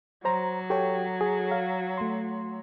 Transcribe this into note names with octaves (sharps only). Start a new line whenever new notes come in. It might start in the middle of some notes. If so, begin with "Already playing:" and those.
F#3 C5 A#5
G4 A4 C#5 G5 C#6
G#4
F5
A3 C6